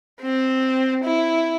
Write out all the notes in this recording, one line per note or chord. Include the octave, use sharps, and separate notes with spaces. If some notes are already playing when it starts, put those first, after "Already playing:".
C4
E4